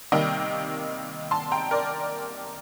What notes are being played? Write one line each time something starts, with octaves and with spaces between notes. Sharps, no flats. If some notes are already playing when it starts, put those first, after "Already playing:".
C3 D#3 G3 A#3 D#5 G5
A5 C6
G5 A#5
A#4 D5